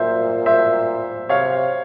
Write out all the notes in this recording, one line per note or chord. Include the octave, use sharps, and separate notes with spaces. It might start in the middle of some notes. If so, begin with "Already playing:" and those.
Already playing: A#2 C5 E5
C5 E5
C3 C#5 F5